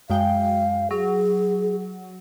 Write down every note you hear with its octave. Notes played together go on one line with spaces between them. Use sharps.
F#2 G#3 F5 G5
F#3 G#4